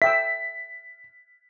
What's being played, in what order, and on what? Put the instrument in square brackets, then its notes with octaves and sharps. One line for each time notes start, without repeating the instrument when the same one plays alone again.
[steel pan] E5 G5 E6 [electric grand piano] B6